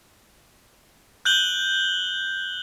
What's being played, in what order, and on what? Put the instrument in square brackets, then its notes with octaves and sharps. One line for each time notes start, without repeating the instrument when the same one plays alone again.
[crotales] F#6 G6 F#7 G7